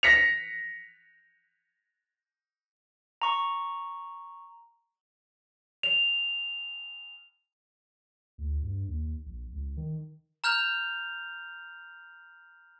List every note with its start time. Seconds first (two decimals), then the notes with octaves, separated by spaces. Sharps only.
0.03 A#6 B6 C#7 F7
3.22 A#5 C#6
5.83 F7
8.38 D2
8.63 G2
8.88 D#2
9.26 A#1
9.52 C#2
9.77 D#3
10.44 A#5 F6 G6 F7